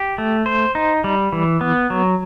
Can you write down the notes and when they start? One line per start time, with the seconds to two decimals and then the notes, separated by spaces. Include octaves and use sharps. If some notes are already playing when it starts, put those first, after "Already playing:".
Already playing: G4
0.18 A3
0.46 C5
0.75 D#4
1.04 G3
1.32 E3
1.61 B3
1.90 F#3